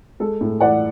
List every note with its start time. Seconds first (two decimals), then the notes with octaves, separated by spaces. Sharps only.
0.20 G#3 A4
0.41 A2
0.60 E3 D5 F#5